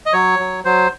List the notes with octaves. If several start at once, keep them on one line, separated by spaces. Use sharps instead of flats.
D#5
F#3 C#5
F#3
F#3 C5